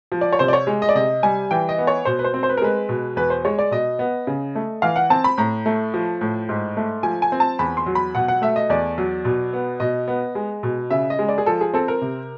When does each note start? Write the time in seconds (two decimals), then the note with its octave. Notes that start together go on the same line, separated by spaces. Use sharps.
0.12 F3
0.21 D5
0.33 C#5
0.39 C3 C5
0.48 D5
0.53 C#5
0.67 G#3
0.82 D#5
0.89 D5
0.95 C3 D#5
1.23 G3 G#5
1.51 E3 G5
1.69 D#5
1.78 B3
1.87 C#5
2.05 B2 C5
2.19 B4
2.24 C5
2.34 C4
2.43 C5
2.49 B4
2.57 A#4
2.62 G#3 B4
2.89 B2
3.16 E2 B4
3.30 C5
3.45 G#3 C#5
3.59 D5
3.71 B2 D#5
3.99 B3
4.27 C#3
4.55 A3
4.82 E3 F5
4.96 F#5
5.10 C4 A5
5.24 B5
5.38 A2 A#5
5.66 A3
5.94 F3
6.21 A2
6.49 G#2
6.77 A3
7.03 F3 G#5
7.22 G#5
7.32 C4
7.40 A5
7.59 E2 B5
7.77 C6
7.86 F#3
7.95 B5
8.15 B2 F#5
8.28 F#5
8.42 A3 E5
8.56 D#5
8.70 E2 D5
8.98 F#3
9.25 B2
9.53 B3
9.80 B2 D#5
10.08 B3
10.35 G#3
10.63 B2
10.91 C#3 E5
11.10 D#5
11.19 G#3
11.29 D5
11.38 G#4
11.46 F3 A4
11.61 G#4
11.74 C4 A4
11.88 A#4
12.02 C3